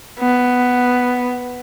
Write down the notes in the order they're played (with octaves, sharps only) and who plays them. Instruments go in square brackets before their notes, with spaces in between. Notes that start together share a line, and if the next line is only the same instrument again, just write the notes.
[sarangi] B3